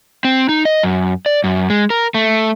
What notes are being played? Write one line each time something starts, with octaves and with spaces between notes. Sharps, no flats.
C4
D#4
D#5
F#2
D5
F#2
G#3
A#4
A3